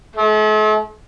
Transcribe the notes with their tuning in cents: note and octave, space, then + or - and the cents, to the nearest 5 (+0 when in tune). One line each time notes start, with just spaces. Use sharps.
A3 -45